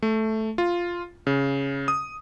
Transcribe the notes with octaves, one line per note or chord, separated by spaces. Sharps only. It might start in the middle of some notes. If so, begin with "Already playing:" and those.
A3
F4
C#3
D#6